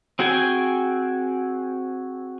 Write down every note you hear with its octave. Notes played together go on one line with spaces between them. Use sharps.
C4 F#4 G#4 G5 G#5